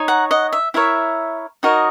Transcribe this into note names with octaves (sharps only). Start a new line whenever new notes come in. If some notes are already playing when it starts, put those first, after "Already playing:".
Already playing: D#4 C#5
F#5 A#5
D#5 F#5
E5
E4 A#4 C#5 E5
D#4 F#4 A#4 C#5 D#5